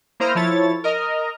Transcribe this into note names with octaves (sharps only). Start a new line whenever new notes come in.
A#3 E4 C5 A#5 D#6 F6
F3 E4 A4 C#5 A6
A#4 D#5 A#5 F6